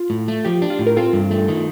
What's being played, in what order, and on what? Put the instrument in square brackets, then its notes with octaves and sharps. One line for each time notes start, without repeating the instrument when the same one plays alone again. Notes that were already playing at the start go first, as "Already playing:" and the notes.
Already playing: [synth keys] F4
[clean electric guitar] A2
A3
[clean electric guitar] F3 [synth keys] G4
[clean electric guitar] D4
[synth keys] F4
[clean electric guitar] A2
[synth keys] A#4
[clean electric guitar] C4 [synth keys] F4 A4
[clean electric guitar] G2
A3
D#3